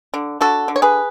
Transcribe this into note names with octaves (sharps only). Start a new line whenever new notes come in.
D3
D3 F#4 A4
D3
C#5
G#4 B4